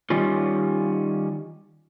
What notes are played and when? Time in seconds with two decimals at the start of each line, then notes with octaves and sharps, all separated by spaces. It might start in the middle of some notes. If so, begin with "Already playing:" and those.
0.10 D#3 G3 C#4 F4